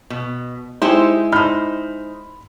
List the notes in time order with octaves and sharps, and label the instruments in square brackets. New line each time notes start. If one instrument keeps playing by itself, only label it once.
[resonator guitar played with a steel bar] B2
[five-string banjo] G#3 E4 [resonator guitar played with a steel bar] D#4 G4 C5
[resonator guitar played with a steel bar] D#4 C5 [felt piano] B5 F6